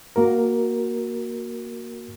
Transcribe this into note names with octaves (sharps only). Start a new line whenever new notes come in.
A#3 F#4 A#4